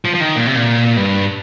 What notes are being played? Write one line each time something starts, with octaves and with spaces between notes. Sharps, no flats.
F3
F3
D#3
A#2
C3
A#2
G2